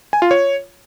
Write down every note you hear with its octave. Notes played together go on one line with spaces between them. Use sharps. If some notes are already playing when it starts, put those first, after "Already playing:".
G#5
F4
C#5